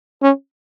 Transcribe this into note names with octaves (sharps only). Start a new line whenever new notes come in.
C#4